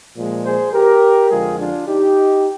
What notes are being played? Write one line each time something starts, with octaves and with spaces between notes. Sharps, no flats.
A#2 F3 G#3
G#4 C5
G4 A#4
F2 D3 F3 G#3 F4 G#4
D4 F4
D#4 G4